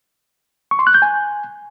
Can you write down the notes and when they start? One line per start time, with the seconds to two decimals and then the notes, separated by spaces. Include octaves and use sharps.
0.71 C#6
0.79 C6
0.87 F#6
0.94 G6
1.02 G#5